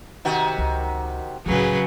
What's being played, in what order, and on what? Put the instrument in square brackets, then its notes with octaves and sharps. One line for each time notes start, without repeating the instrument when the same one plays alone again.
[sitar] C3 D#3 F#4
[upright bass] C#2
[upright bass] C#2 A2 [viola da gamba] C#3 F#3 [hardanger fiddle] G#4 B4